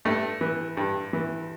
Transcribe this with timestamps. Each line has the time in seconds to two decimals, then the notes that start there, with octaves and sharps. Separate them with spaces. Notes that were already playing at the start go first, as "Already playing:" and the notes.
0.05 G2 A3
0.41 E3
0.77 G2
1.13 E3